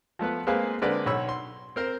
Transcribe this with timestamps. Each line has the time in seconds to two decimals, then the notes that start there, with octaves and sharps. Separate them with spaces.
0.19 F3 A3 B3 B4
0.47 G#3 A#3 C4 G#4 B4 F5
0.82 D3 G#3 C4 A#4 B4 D5
1.06 B1 B2 C#5 B5 E6
1.29 C6
1.76 C4 A#4 C5